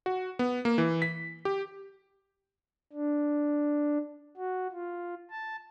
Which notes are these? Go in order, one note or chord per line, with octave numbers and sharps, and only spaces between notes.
F#4
B3
A#3
E3
B6
G4
D4
F#4
F4
A5